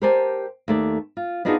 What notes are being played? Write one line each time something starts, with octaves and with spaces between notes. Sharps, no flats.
G4 A#4 C5 D5 G#5 A5
D#2 A3 D5
F4
B3 D4 D#4 F4 F#4 G#4